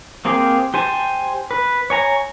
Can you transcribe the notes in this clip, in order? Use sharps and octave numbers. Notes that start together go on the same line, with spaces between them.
A#3 C4 G4 G#4
G4 C5 G#5 A5
B4
C#5 G#5 A#5